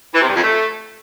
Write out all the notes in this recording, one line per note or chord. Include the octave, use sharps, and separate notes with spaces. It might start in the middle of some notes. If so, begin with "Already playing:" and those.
E3
C3
G2
F2
A3